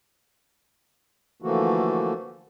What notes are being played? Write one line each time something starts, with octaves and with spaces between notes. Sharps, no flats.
D3 E3 F3 A3 A#3 F#4